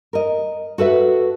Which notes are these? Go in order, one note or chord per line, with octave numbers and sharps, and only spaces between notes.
A#4 D#5
F#4 A4 B4 E5